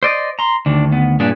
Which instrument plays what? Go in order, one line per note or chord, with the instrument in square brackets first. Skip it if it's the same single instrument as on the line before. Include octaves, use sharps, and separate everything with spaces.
[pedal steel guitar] C5 D5 D#5
A#5 C6
[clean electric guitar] D2 D#3 [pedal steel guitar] D4
[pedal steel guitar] B3
[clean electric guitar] G2 A#2 D4 [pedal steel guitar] G#4 B4